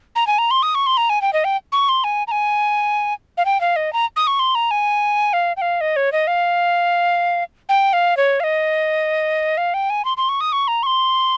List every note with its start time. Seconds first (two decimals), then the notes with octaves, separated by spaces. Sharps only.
0.16 A#5
0.27 G#5
0.38 A#5
0.51 C6
0.62 D#6
0.75 C#6
0.86 C6
0.97 A#5
1.09 G#5
1.22 G5
1.33 D#5
1.44 G5
1.72 C#6
1.89 C6
2.04 G#5
2.27 A#5
2.31 G#5
3.37 F5
3.45 G5
3.61 F5
3.76 D#5
3.93 A#5
4.16 D#6
4.27 C#6
4.39 C6
4.55 A#5
4.71 G#5
5.33 F5
5.57 G5
5.61 F5
5.81 D#5
5.96 C#5
6.12 D#5
6.27 F5
7.69 G5
7.93 F5
8.17 C#5
8.40 F5
8.44 D#5
9.57 F5
9.74 G5
9.90 G#5
10.05 C6
10.17 C6
10.29 C#6
10.40 D#6
10.52 C#6
10.68 A#5
10.83 C#6
10.86 C6